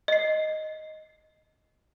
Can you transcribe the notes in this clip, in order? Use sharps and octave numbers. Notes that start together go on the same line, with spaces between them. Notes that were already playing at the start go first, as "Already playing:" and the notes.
D#5 C7